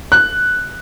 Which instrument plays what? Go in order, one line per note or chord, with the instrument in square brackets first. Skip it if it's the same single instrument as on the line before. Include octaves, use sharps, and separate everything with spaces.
[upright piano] F#6